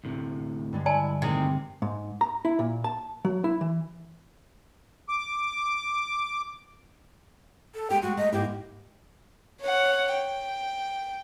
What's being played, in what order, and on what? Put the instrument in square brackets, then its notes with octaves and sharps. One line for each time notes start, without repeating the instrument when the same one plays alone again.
[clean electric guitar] D2 A2 C3
[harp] G2 D3 G#3
[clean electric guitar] E4 [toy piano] D5 G#5 A5
[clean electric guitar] A2 D#3 G#4 [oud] C3
[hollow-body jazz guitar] G#2
A#5
E4
A#2
A5
F#3
E4
E3
[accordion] D6
[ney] A4
[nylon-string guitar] G#3 G4 [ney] G5
[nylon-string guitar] G#3 A3 G#4 [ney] F#4
[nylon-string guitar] A3 [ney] D#5
[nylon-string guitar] G#2 A#3 E4 [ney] G4
[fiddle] C#5 F#5
G5